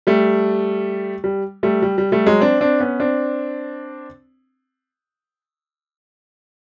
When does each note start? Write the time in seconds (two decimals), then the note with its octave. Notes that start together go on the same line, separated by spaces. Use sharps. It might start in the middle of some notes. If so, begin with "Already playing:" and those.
0.07 G3 A3
1.24 G3
1.63 G3 A3
1.82 G3
1.98 G3
2.12 G3 A3
2.27 F#3 G#3
2.41 C4 D4
2.61 C4 D4
2.80 B3 C#4
3.00 C4 D4